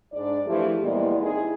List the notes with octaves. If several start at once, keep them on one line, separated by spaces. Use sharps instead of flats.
G#2 D4 D5
E3 F3 A3 E4 G4
E2 A#2 G3 G#3 B3 E4
C4 D#4 E4 G#4